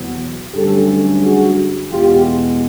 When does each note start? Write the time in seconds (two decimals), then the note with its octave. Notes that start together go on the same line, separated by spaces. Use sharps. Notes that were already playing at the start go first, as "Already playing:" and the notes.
Already playing: E2 B2 F#3 B3
0.53 G2 D3 F#3 A3 C#4 G4 A4
1.22 F#4 G#4
1.91 E2 B2 G#3 B3 F4 G4